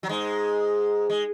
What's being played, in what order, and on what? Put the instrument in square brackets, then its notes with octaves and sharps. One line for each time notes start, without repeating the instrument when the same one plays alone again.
[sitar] F#3
G#2 G#3
G#3